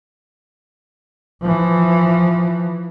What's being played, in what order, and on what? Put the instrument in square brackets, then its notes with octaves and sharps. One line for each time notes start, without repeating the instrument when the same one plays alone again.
[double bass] E3 F3